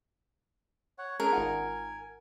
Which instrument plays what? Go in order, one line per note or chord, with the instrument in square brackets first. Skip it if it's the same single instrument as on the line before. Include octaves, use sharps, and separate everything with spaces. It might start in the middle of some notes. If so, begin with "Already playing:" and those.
[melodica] C#5 F#5
[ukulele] C#4 [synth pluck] G#4 [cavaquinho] A#4 [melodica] G#5
[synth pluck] G#1 D#4 F4 [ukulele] F#5